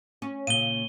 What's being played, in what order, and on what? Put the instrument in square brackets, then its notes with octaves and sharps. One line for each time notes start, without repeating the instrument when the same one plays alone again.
[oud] C#4
[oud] A#2 C#3 [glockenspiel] D#7 G7